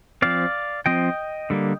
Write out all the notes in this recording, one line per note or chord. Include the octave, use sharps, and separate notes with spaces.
F3 C4 D5 F5
F3 C4 D#5 G5
D3 G3 A#3